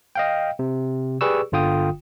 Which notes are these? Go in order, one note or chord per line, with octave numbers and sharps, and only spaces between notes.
D#5 F5 G5
C3
G4 G#4 B4 D5 C#6 E6
G1 D3 F4 G5 D#6